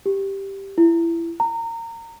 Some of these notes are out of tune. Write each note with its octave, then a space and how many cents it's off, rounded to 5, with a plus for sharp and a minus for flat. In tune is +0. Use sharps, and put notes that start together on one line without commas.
G4 +0
E4 +20
A#5 -25